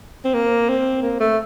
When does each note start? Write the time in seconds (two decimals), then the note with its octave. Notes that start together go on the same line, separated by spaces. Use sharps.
0.25 C4
0.34 A#3
0.69 C4
1.02 A#3
1.20 A3